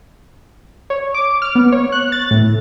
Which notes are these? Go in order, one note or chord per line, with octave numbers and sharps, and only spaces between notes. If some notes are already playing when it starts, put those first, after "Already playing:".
C#5
D6
F6
B3
C#5
F#6
A6
A2